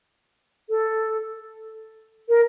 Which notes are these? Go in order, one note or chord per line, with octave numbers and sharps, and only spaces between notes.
A4
A#4